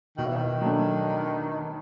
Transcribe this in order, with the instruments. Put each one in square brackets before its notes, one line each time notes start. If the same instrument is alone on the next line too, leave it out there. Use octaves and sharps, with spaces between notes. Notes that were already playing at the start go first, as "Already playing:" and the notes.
[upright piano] B2 [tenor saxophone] D#3
[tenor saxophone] E3
D#3
[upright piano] F#3 A3 D4